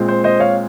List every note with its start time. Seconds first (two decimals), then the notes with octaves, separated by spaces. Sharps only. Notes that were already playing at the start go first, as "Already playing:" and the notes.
Already playing: A#2 G#3 C4
0.09 C5
0.24 C5 D#5
0.40 C#5 F5